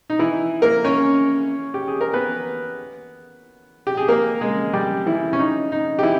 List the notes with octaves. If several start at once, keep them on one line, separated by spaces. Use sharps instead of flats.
D#4
E3 E4
A#3 A#4
C#4 C#5
G4
G#4
A#4
B3 B4
G4
G#4
A#3 A#4
G#3 G#4
G3 G4
E3 E4
C#4
D#4
D#4
G4
E3 E4